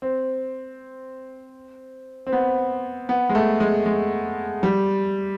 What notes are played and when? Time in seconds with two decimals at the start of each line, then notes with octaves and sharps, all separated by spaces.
0.02 C4
2.27 C4
2.32 B3
3.09 B3
3.29 G#3
3.35 A3
3.60 G#3
3.86 G#3
4.63 G3